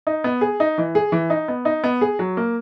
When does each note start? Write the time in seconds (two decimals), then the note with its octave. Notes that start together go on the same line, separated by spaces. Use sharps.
0.07 D#4
0.24 B3
0.41 G#4
0.60 D#4
0.78 E3
0.95 G#4
1.12 E3
1.30 D#4
1.48 B3
1.65 D#4
1.84 B3
2.01 G#4
2.19 F#3
2.37 A#3